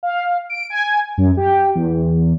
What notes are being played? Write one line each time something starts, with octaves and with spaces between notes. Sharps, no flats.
F5
D7
G#5
F#2
G4
E2